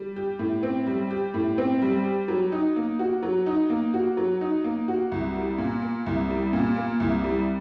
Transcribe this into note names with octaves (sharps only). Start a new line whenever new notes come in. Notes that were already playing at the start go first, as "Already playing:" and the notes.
Already playing: G3
G4
A2
C4
G3
G4
A2
C4
G3
G4
F#3
D#4
A#3
F#4
F#3
D#4
A#3
F#4
F#3
D#4
A#3
F#4
C2
G3
A#2
A#3
C2
G3
A#2
A#3
C2
G3